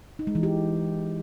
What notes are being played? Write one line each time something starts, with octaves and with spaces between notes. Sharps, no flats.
D#4
G#3
E3
G4